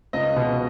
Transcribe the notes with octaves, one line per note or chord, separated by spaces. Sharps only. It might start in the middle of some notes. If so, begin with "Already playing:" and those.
C#2 D#5
B2